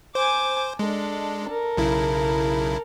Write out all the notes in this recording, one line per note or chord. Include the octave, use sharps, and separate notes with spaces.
C5 G#5 D6
G#3 D4 A4
A4 A#4
B1 C#3 E4